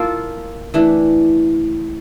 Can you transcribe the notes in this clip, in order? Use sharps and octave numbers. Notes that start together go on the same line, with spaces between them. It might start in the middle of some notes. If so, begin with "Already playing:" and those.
Already playing: A#3 F4 A4
E3 A3 D4